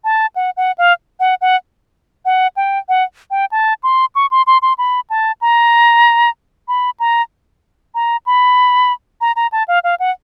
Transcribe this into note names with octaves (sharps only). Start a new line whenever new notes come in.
A5
F#5
F#5
F5
F#5
F#5
F#5
G5
F#5
G5
A5
C6
C#6
C6
C6
C6
B5
A5
A#5
B5
A#5
A#5
B5
A#5
A#5
A5
F5
F5
F#5